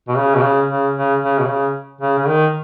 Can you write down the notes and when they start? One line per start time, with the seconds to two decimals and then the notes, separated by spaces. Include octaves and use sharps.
0.08 B2
0.18 C#3
0.36 B2
0.43 C#3
0.69 C#3
0.96 C#3
1.22 C#3
1.39 B2
1.48 C#3
2.01 C#3
2.19 C#3
2.28 D#3